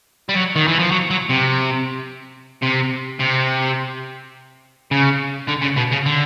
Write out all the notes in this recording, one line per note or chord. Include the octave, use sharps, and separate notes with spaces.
G3
F#3
D#3
E3
F3
F#3
F#3
C3
C3
C3
C#3
D3
C#3
B2
C#3
D3